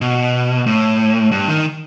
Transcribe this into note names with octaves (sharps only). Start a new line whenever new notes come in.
B2
A2
G2
D#3